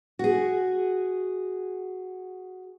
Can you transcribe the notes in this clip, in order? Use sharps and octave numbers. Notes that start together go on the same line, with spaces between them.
F#4 G#4